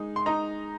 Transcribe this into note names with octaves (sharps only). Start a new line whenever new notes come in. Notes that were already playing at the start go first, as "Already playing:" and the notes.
Already playing: G#3 D#4
C6
D#4 A#5